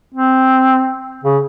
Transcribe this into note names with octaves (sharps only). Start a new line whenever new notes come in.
C4
C#3